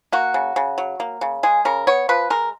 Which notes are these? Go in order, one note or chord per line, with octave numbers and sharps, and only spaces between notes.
A#3 F#4
C#3
C#3
F#3
A#3
C#3
G#3 G#4
C#3 A#4
B3 C#5
F3 B4
G#3 A#4